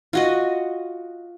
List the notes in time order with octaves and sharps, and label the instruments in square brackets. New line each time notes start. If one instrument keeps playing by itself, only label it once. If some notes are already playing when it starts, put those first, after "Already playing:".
[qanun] F4 F#4 D#5